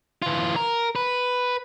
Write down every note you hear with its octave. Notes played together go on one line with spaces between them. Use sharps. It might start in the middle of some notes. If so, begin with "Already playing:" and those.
E3 F4
A#4
B4